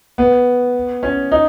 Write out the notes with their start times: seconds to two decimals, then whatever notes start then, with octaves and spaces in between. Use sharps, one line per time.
0.18 B3
1.03 C#4
1.32 D#4